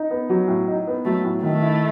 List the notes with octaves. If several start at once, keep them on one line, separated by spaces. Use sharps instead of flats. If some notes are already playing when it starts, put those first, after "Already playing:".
Already playing: D#4
B3
F#3
A2
D#4
B3
F#3 A3
A2
D#3 A3
E4